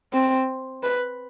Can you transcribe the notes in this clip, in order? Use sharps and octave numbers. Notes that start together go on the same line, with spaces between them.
C4
B4